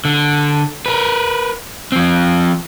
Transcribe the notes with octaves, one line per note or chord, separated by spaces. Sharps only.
D3
A#4 B4
F3 C4